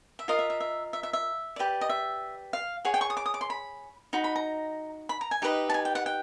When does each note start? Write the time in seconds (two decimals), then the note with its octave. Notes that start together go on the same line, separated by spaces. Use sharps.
0.19 E5
0.28 F4 A#4 D#5 F5
0.39 E5
0.50 E5
0.60 E5
0.93 E5
1.03 E5
1.13 E5
1.56 G4 B4 D5
1.81 D#5
1.90 E5
2.53 F5
2.85 G#4 C#5 F#5
2.94 G5
3.01 C#6
3.10 D#6
3.17 D6
3.26 D#6
3.34 D6
3.41 C6
3.50 B5
4.13 D#4 F#4 B5
4.24 B5
4.36 A#5
5.09 B5
5.21 A#5
5.31 G#5
5.42 D#4 G4 B4 D#5
5.70 A5
5.74 G#5
5.85 G5
5.95 F#5
6.06 G5